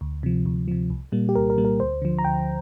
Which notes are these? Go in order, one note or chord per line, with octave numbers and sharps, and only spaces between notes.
D2
C3 F3
D2
C3 F3
C2
A#2 G3 A#3
G4
C2 A#4
A#4
A#2 G3 A#3
A#4
D2 C5
D3 F3
A#5
D2 G5